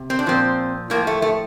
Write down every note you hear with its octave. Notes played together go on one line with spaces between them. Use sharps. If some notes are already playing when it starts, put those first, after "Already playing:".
Already playing: C3
C4
D4
A#2 F3 C4
A2 F3 A#3
A3
A3